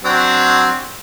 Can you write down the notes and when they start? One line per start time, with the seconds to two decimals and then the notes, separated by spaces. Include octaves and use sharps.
0.05 F#3 C4 D4